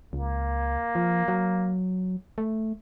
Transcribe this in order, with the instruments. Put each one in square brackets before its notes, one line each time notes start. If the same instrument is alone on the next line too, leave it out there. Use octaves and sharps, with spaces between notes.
[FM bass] C#2 [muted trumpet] A#3
[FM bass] F3
F#3
A3